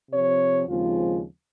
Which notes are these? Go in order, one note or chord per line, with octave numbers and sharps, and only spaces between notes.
C3 F3 C4 C#5
D#2 C#3 F3 G#3 C4 F4